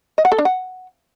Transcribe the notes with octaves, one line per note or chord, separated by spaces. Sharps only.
D#5
F#5
A4
D4
F#5